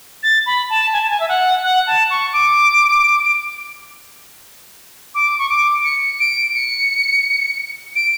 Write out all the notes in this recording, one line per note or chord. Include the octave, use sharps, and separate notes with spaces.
A6
B5
A5
G#5
A5
G#5
E5
F#5
F#5
A5
C#6
D6
D6
C#6
D6
C#7
D7
C#7
D7